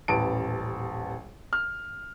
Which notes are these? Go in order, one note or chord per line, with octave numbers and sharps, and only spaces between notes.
D#1 A1 B4 A5 D7
F6